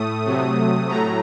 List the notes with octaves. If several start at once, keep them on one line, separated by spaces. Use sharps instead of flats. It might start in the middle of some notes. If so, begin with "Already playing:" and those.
Already playing: A2 A3 D#6
C3 F#3 A3
A2 F#3 A3 A#5